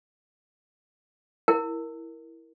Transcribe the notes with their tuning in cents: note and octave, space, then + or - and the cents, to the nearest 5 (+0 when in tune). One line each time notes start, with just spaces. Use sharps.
E4 +0 A#4 +0